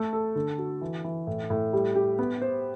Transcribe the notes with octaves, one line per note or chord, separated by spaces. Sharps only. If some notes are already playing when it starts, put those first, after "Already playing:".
Already playing: A3 A4
A4
D3
F#4
E3
E3
A2
A2
G3
G4
B3
C5